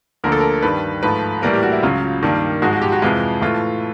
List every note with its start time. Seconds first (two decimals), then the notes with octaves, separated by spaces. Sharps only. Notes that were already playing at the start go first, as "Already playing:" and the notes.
0.24 D2 D3 F3 A#3 A#4
0.32 A4
0.41 A#4
0.63 G2 D#3 G3 B4
1.03 G#2 F3 A3 B4
1.42 A2 E3 G3 A#3 A#4
1.53 G4
1.63 F#4
1.72 E4
1.83 C#2 C#3 F#3 F4
2.23 G2 D#3 G3 A#3
2.62 G#2 F3 G#3 F#4
2.73 F#4
2.82 G4
2.92 F#4
3.02 F2 C3 E3 G#3 F4
3.41 A2 E3 A3 F4